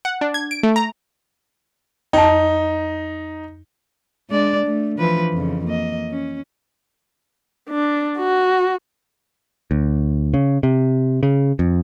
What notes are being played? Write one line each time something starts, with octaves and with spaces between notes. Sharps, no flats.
F#5
D4
G#6
D7
A3
A#5
F2 D#4 A5
G#3 D4 D5
A3
E3 F3 B4
F2 C#3
A#3 D#5
C#4
D4
F#4
D2
C#3
C3
C#3
F2